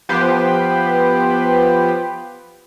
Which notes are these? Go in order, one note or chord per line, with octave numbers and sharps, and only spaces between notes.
F3 B3 G4 B4 C5